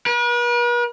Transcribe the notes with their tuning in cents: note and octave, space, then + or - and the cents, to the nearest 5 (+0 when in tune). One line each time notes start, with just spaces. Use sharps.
B4 -45